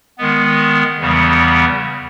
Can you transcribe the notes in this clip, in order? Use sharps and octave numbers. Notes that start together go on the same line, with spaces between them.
D#3 G#3 B3
E2 C#3 E3 G3 B3